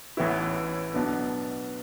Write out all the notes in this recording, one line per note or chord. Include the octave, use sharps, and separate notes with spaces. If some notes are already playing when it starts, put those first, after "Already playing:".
A1 A2 E3 B3 E4
B1 B2 B3 D4